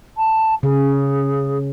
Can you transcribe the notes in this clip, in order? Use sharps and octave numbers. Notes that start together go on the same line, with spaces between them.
A5
C#3 G#4